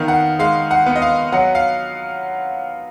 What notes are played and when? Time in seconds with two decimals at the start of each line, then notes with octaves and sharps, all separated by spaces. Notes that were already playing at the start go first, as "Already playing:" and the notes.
Already playing: D#3 B3 F5
0.08 F#5
0.39 G#3 F5
0.71 F#5
0.86 B3
0.96 D#5
1.02 F5
1.32 F#3 F#5
1.55 F5